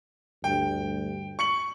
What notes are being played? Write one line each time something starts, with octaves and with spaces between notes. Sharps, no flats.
D2 G2 G5
C#6 C#7 F#7